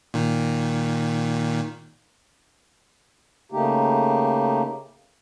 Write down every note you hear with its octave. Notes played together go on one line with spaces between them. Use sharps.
A#2 D#3
C#3 A3 A#3 D#4 G4